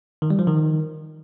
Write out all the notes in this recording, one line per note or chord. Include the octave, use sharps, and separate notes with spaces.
D#3
G3
F3
D#3